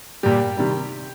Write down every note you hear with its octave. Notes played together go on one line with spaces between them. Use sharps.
A#2 G3 G4
C3 D#3 G3